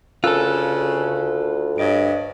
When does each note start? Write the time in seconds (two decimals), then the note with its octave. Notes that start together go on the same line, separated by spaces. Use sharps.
0.24 D2 C#3 F4 A4 A#4 E6 F#6
1.78 G2 C#5 D#5 D7